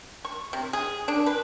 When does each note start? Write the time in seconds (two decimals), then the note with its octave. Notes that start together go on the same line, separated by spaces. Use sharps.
0.25 C#6
0.53 C3
0.73 G#4
1.08 D4
1.26 B4